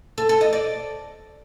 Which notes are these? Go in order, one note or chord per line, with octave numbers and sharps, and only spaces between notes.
A4
A4
D#5
D5